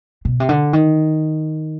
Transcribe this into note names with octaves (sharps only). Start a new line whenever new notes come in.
B2
C3
D3
D#3